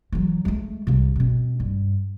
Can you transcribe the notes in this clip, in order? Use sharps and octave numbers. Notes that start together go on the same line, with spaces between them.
E3 F#3
G#3 A3
C2 C3
B2 C4
G2